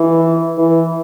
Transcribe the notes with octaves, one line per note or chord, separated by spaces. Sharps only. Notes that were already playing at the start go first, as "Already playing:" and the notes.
Already playing: E3
E3